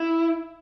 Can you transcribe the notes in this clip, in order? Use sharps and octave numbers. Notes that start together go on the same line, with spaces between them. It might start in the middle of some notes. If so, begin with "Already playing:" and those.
Already playing: E4